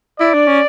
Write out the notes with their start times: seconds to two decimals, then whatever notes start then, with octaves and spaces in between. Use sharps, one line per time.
0.20 E4 D5
0.34 D4
0.47 C#4